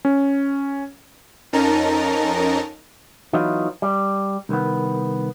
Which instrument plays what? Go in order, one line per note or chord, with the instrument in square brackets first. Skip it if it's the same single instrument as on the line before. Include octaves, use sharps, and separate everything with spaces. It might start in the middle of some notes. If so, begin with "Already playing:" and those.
[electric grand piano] C#4
[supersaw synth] F2 C#4 D#4 A#4 A5 A#5
[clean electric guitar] E3 F#3 B3 D#4 F4
G3
C2 D#3 B3